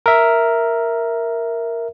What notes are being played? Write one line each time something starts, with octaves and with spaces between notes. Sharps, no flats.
A#4 E5